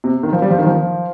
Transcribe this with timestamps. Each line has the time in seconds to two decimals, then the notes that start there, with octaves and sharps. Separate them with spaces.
0.04 C3
0.23 D#3
0.33 F3
0.42 G3
0.51 F3
0.59 D#3
0.66 F3